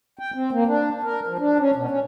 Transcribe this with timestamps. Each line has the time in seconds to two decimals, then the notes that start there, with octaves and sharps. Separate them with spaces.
0.19 G5
0.34 C4
0.52 A#3
0.67 D4
1.04 A#4
1.27 F3
1.38 D4
1.59 C#4
1.75 B2
1.91 C#4